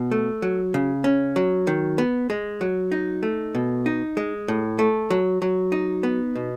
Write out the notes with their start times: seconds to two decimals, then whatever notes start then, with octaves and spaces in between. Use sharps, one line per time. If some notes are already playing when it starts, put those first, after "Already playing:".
Already playing: B2
0.11 A3
0.42 F#3
0.74 C#3
1.04 C#4
1.36 F#3
1.67 D#3
1.98 B3
2.30 G#3
2.61 F#3
2.92 D#4
3.23 A3
3.55 B2
3.86 D#4
4.17 G#3
4.48 A2
4.79 A3
5.10 F#3
5.42 F#3
5.72 D#4
6.03 B3
6.35 B2